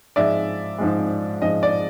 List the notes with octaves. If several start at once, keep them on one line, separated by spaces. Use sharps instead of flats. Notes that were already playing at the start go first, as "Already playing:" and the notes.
G#2 F3 G#3 D5 E5
G#2 F3 G#3
G#2 F3 G#3 D#5
D5